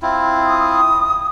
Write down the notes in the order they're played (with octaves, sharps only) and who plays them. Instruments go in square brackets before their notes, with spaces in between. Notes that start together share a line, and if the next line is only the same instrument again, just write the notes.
[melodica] C4 E4 F4
[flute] D#6